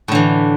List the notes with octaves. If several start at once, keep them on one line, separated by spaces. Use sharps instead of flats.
A2 D3 E3